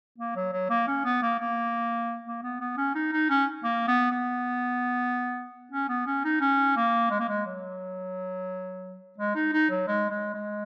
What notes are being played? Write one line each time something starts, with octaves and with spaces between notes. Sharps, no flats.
A#3
F#3
F#3
A#3
C#4
B3
A#3
A#3
A#3
B3
B3
C#4
D#4
D#4
C#4
A#3
B3
B3
C#4
B3
C#4
D#4
C#4
A#3
G#3
A#3
G#3
F#3
G#3
D#4
D#4
F#3
G#3
G#3
G#3